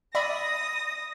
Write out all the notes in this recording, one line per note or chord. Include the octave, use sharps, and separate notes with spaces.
D5 E5 B5 D#6 A#6